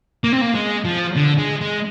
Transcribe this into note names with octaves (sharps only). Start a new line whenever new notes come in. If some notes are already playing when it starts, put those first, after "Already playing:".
A#3
C4
A#3
G#3
F3
D3
G#3
G#3